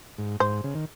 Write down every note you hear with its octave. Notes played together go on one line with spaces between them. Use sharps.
G#2
G#2 C5
C#3
D#3